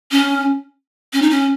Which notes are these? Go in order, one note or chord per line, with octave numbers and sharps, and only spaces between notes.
C#4
C#4
D#4
C#4